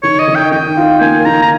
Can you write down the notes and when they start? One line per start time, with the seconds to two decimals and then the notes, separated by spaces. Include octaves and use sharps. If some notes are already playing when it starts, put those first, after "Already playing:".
0.03 D#3 C#5
0.19 D#5
0.27 D#3
0.35 G5
0.51 D#3 G5
0.77 F4
1.01 A#3 G#5
1.25 D#3 A#5
1.42 A#5